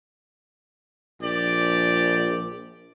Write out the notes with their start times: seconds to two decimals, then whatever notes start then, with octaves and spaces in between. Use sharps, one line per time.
1.21 A#1 G4 D5